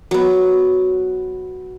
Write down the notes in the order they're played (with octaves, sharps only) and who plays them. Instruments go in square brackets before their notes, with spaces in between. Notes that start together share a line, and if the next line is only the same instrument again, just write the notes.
[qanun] F#3 B3